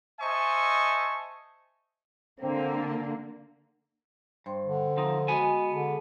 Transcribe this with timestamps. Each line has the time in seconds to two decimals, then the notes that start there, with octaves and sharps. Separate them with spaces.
0.21 C5 D#5 E5 G#5 A5 C#6
2.40 D3 A#3 C4
4.46 G2 C5 G5 C6
4.65 D3
4.97 F3 C4 D#4
5.28 G#3 B3 F#4 D#5 G#5
5.72 D3 G#4 A5